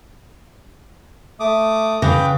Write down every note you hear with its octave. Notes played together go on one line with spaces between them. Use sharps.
A3 D6 D#6
C#3 B4 G5 D6